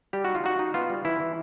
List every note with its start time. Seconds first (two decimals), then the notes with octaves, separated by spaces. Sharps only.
0.13 G3 G4
0.25 D#4 F#4
0.35 F4
0.44 D#4 F#4
0.59 D#4
0.74 B3 F4
0.90 G3
1.05 E3 E4
1.20 E3